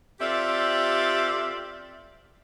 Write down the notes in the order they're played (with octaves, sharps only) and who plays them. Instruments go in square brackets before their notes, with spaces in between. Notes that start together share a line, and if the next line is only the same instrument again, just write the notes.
[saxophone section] C4 F4 G4 A4 D5 E5